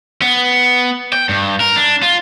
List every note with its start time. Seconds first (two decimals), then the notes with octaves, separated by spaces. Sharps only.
0.22 B3
1.13 G5
1.29 G2
1.60 A#4
1.76 D4
2.03 F4